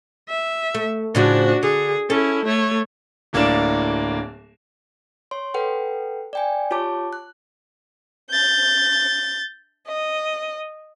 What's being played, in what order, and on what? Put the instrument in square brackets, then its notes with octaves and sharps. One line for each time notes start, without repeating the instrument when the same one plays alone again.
[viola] E5
[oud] A3
[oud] A2 C#3 F3 [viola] D4 F#4
[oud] D3 [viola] G#4
[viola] C#4 E4 [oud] A4
[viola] A3 C#5
[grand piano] D1 A2 A#3 D4 D5 E7
[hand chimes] C#5 C6
A4 B4 F#5 G5
D5 G5 G#5
F4 G4 C#5 A5 D6
F#6
[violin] G6 A6
D#5